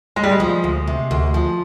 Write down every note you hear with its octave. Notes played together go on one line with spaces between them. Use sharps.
D2 G#3
G3
G#3
F3
D2
C3
D2
F3